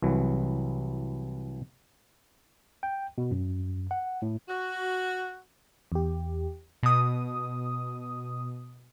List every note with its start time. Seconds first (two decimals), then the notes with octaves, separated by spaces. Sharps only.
0.02 C2 E3 F#3
2.83 G5
3.18 B2
3.31 F#2
3.91 F#5
4.22 A2
4.49 F#4
5.92 E2 G4
6.83 B2 D#6